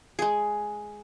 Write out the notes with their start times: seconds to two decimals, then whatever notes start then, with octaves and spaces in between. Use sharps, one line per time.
0.19 G#3 G#4